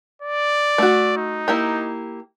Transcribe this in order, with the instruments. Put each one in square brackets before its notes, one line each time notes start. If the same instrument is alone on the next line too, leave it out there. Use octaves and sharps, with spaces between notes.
[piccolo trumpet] D5
[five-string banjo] A3 F#4
[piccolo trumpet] D#4
[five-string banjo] A#3 E4 G4